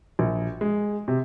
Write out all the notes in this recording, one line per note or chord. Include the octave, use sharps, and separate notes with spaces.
A#1
G#3
C3